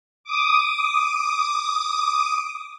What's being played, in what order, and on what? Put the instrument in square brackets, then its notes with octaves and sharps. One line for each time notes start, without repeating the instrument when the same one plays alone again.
[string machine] D6 D#6